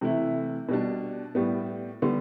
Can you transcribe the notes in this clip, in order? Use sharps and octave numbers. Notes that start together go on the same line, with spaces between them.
C3 E3 A3 E4
B2 G3 D4
A2 G3 B3
D3 G3 B3